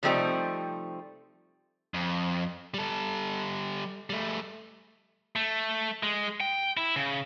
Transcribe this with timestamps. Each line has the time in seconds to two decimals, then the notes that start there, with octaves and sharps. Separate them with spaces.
0.03 C3 F3 G3 A3 C4 D#4
1.94 F2
2.74 G3 A4
4.10 G3 A3
5.36 A3
6.03 G#3
6.40 G5
6.77 E4
6.96 C#3